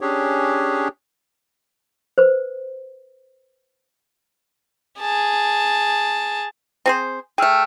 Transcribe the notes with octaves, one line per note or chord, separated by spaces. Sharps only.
C#4 D4 G4 G#4 C#5
B4 C5
G#4 A5
C4 G#4 C5
A3 G#4 G5 E6 F6